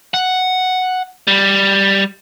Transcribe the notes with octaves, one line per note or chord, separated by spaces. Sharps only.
F#5
G3